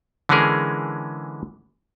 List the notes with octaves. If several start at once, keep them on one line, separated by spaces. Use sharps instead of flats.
D3 E3 G#3 C#4 G#4 A#4